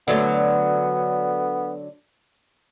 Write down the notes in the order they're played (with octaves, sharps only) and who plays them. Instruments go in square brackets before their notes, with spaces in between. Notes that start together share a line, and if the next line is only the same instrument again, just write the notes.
[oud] D3 F#3 A3 [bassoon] B3